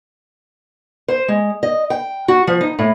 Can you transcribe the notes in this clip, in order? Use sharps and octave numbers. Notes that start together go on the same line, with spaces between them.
C5
G#3
D#5
G5
F#4
F3
D#4
A2